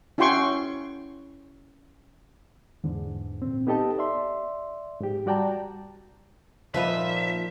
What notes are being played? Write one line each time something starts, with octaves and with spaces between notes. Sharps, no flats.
C#4 E4 F#4 G5 C6 C#6
E2 G#2 D3
A#2 C4
B3 D#4 G4 A4 D#5 A5
D5 E5 C6
G#2 G4
G3 F#4 D5 G5 A5 A#5
A#2 F3 D#4 F4 B4 E5